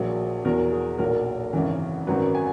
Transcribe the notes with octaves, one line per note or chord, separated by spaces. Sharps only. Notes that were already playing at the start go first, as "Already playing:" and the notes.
Already playing: A#1 A#2 F#3 G#4
E2 B2 F#3 A#4
G#4
B1 A#2 F#3 A#4
G#1 F#2 C#3 E3
G#1 F#2 D#3 F#3 B4
G#5